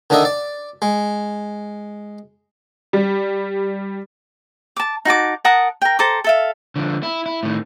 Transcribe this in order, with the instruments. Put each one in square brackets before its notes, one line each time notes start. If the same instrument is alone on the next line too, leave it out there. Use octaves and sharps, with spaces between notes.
[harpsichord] D3 D#3 D4 D#5 E5
D5
G#3
[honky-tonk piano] G3
[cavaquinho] A5 D6
D#4 F#4 A5 D6
A#4 F#5 A5 D#6
A#4 G5
A4 C5 A#5 D6
A4 E5 F5
[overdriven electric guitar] D3 F3
E4
E4
A2 D#3